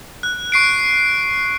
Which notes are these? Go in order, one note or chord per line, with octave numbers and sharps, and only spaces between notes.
F#6
C#6 C7 D7